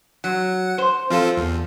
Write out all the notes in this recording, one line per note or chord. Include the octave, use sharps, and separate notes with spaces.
F#3 F#5
C5
F3 C4 F4 A4
E2